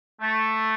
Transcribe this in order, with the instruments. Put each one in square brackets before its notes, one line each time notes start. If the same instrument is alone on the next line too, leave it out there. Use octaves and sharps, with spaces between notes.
[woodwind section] A3